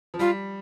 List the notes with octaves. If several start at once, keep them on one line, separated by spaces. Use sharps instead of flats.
F3
G3 F4